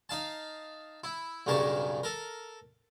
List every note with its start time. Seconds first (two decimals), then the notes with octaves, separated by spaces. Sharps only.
0.09 D#4 F5 A5
1.04 E4
1.46 B1 G2 C#3 A#4 A5 C#6
2.03 A4 A#4